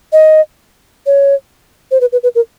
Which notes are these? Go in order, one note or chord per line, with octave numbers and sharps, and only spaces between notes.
D#5
C#5
C5
B4
B4
B4
A#4